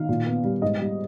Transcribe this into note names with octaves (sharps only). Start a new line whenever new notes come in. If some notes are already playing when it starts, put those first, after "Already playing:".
Already playing: D#3 F5
A#2
B3
G3
G#2 D#5
G3